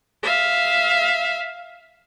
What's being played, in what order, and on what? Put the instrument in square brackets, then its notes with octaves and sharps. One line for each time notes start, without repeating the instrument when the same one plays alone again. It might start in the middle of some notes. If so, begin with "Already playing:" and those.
[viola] E5 F5